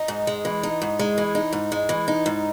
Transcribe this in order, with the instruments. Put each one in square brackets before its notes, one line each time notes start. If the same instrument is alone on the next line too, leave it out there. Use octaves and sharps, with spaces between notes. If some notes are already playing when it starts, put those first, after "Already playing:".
Already playing: [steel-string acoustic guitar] D#4
G#2
G#3
E3
D#4
G#2
G#3
E3
D#4
G#2
G#3
E3
D#4
G#2